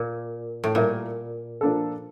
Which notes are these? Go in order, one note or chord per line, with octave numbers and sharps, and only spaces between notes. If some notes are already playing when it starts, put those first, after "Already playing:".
Already playing: A#2
A2
A#2 G3 A#3 E4 A#4 E5
F3 A#3 D4 A4